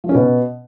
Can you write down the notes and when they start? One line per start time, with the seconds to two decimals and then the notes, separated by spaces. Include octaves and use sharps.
0.04 F3
0.09 C#4
0.15 B2